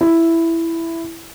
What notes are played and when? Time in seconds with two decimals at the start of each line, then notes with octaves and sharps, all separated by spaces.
0.01 E4